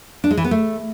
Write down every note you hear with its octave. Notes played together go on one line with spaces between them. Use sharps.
D4
G#3
E3
B3
A3